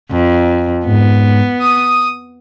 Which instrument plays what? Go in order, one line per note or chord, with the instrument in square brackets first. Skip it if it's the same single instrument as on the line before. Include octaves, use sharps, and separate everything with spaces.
[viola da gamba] F2
[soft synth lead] G#2 [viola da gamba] B3
[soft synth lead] D#6